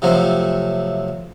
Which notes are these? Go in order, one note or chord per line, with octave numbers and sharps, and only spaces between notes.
C3 F3 F#3 A3